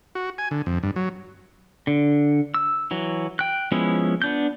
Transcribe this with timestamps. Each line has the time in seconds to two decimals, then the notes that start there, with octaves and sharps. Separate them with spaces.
0.15 F#4
0.38 G#5
0.51 D3
0.66 F2
0.83 G2
0.96 F#3
1.87 D3
2.54 E6
2.91 E3 F#3
3.39 G5 F#6
3.72 F3 G#3 B3 C#4 E4
4.22 B3 D4 G6